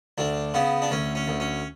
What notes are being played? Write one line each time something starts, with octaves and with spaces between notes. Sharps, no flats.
D2 D4
C#3 B3
D4
D2 C#4
C#4
D2
C#4